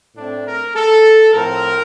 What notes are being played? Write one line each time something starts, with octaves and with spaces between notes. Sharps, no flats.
A2 A3 C4 D4
A#4
A4
A2 F3 C4 A#4